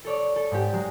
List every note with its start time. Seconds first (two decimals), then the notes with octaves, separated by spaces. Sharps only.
0.05 A4 C#5 D5
0.36 A4
0.51 G#2 G4
0.73 F#3 G#3